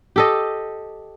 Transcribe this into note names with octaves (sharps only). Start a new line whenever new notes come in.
G4 A4 D#5